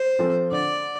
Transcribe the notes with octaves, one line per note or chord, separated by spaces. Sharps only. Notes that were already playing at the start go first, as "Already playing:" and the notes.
Already playing: C5
F3 C4 F4 A4
D3 D5